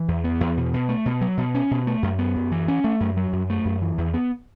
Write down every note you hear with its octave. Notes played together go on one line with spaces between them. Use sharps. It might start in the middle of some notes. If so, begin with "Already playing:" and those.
Already playing: E3
E2
B3
E2
B2
B2
A3
B2
F#3
B2
C#4
B2
A3
F#2
B3
F#2
E3
C#4
A3
F#2
F#3
F#2
A3
F#2
E3
E2
B3